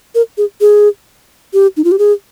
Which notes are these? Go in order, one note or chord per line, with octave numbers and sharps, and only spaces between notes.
A#4
G#4
G#4
G4
D#4
F4
G4
G#4